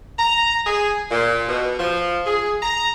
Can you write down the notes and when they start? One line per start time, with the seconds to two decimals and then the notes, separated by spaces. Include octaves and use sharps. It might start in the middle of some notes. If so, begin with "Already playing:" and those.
0.18 A#5
0.66 G#4
1.10 A#2
1.48 B2
1.79 F3
2.26 G#4
2.62 A#5